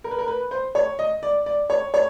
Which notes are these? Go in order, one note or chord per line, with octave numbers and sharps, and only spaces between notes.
A#4
B4
A#4
B4
C5
C#5
D#5
D5
D5
C#5
C#5